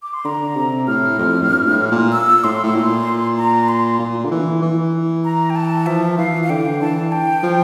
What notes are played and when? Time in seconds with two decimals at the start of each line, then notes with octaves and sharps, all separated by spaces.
0.03 D6
0.14 C6
0.25 D3 A#5
0.56 C3
0.87 A2 F6
1.19 F2
1.41 A2
1.50 G2
1.66 A#2
1.70 A2
1.92 A#2
2.12 E6
2.44 A2 C6
2.63 A2
2.75 A#2
3.38 A#5
3.68 C6
4.00 A#2
4.25 D3
4.31 E3
4.62 E3
5.25 A#5
5.50 G5
5.56 A5
5.86 F3 E5
6.18 E3 F5
6.43 F5
6.49 D3 G5
6.81 E3 A5
7.12 G5
7.43 F3